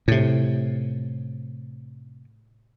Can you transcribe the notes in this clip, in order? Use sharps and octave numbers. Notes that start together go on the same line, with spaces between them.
A2 C3